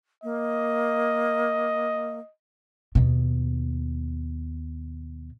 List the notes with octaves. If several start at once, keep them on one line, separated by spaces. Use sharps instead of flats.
A#3 D#5
D#2 B2